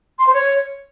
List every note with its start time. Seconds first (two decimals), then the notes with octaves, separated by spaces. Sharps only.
0.19 C6
0.27 C5
0.35 C#5